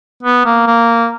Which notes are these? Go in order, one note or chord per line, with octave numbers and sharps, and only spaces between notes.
B3
A#3
A#3